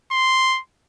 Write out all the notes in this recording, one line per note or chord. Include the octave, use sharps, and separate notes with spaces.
C6